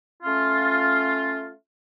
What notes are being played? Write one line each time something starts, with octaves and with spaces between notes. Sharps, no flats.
A3 C#4 F4